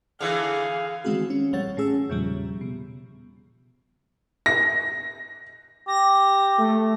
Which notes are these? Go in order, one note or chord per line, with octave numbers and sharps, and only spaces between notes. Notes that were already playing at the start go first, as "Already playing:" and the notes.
D3 E3 G#4 F5
D#3 E3 G#3 C4 F#4 G#4
C#4
A#1 E3 G3 C#5 F#5 A6
A2 C#4 G#4 E6
E2 A#2 C#3 F3 G3
B2
A#6
G4 A#6
A3